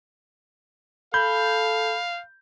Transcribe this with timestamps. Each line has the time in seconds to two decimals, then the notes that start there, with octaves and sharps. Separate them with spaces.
1.14 A4 F5 B5 G6